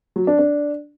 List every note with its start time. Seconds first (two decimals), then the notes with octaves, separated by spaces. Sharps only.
0.16 F#3
0.27 D4
0.39 D4